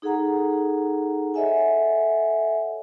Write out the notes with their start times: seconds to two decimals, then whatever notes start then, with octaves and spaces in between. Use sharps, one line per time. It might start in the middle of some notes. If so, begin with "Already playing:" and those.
0.02 D#4 G#4 A4 F#5 A#5
1.34 A4 C#5 D#5 E5 F#5 G#5